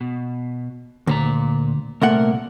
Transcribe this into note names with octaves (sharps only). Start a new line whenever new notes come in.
B2
D2 A#2 C5 A#5
C2 A#2 A3 A#4 F#5